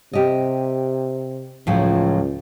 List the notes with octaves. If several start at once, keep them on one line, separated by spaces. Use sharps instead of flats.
C3 G4 D#5
C#2 A2 F3 F#3